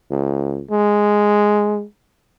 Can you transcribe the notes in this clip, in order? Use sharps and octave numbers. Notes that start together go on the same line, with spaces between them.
C#2
G#3